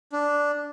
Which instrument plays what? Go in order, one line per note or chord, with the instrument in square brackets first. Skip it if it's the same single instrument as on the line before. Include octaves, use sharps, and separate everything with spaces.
[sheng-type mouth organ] D4